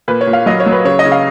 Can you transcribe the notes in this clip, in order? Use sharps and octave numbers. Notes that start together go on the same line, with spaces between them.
A#2 B4
C#5
A#2
F5
F#3 D#5
C#5
F#3
B4
C#3 C#5
D#5
C#3
F5